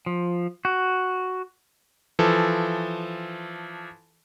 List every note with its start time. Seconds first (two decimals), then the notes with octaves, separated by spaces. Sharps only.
0.06 F3
0.65 F#4
2.19 E3 F3 A4